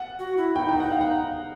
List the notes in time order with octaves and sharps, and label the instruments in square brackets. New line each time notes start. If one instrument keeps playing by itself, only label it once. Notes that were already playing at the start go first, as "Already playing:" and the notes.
Already playing: [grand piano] F#5
[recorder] F#4
E4
[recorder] D#4 [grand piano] G5
[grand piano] F#5
G5
F#5
F5
F#5